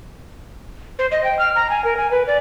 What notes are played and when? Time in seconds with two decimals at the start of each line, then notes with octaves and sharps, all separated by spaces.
0.99 C5
1.11 D#5
1.24 G5
1.39 F6
1.56 A#5
1.70 G#5
1.84 A#4
1.97 G#5
2.11 B4
2.27 D5